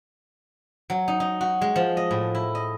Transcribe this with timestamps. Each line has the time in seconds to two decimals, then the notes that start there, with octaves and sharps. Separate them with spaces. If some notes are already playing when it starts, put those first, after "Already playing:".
0.90 F#3
1.08 D#4
1.20 D#4
1.41 F#4
1.61 G#3
1.76 F3
1.97 D#5
2.11 A2
2.35 E4
2.55 D#5